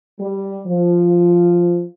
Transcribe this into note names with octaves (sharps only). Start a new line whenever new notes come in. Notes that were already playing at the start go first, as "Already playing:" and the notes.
G3
F3